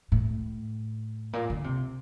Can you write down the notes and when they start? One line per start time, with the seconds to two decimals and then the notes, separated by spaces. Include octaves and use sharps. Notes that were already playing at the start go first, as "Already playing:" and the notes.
0.12 A2
1.33 A#2
1.50 D3
1.64 C3